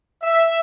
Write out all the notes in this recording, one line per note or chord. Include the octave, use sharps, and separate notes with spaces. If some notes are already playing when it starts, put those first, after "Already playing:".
E5